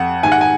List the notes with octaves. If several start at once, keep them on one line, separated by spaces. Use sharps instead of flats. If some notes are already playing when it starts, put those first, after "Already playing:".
Already playing: F2 F#5
G#2 D#3 G#5
F#5
G#5